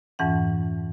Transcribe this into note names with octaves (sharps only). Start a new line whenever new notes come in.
F2 G#2 E3 C#4 F#5